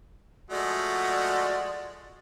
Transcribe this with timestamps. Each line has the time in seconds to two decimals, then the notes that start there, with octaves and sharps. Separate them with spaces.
0.51 F3 G#3 A3 F#4 D5